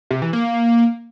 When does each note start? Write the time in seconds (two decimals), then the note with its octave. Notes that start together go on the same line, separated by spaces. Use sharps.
0.11 C3
0.22 E3
0.33 A#3